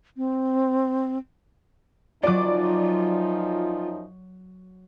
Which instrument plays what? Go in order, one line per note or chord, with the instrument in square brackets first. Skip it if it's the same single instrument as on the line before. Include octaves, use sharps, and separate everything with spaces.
[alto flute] C4
[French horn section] F#2 F3 D#4 [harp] F#3 D7 [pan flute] F4 [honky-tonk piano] D5 D6